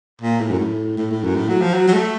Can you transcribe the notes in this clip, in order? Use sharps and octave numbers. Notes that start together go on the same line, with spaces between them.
A#2
A2
F#2
A2
A2
A2
F#2
A2
F#3
F3
F#3
F#3
A3